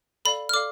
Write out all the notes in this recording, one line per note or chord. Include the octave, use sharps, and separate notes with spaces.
A4 D5 F5 B5
F6
A4 D5 F5 D6